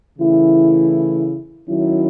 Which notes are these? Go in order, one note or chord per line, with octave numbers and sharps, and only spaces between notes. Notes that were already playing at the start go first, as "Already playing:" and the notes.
C#3 E3 A3 E4
D#3 F#3 C#4 E4